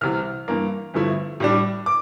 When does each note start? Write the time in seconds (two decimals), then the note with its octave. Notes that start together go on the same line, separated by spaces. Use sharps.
0.01 C2 C3 E3 F6
0.48 G2 E3 A#3
0.94 G1 G2 F3 A3 E4
1.40 A2 G3 D4
1.86 D6